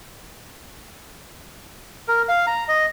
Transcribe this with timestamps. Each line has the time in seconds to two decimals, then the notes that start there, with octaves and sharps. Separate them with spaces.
2.08 A#4
2.29 F5
2.47 A#5
2.68 D#5